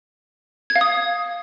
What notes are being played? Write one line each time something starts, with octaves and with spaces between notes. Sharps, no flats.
G#6
F5
D#6